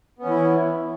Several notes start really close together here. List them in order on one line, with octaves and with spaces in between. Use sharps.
B3 C#4 E3 E4